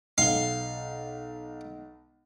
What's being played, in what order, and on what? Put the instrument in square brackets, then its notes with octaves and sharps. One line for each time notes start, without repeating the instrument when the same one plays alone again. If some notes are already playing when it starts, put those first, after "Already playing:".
[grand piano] B1 G7 [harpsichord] F5